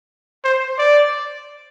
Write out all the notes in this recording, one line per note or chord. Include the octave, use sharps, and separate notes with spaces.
C5
D5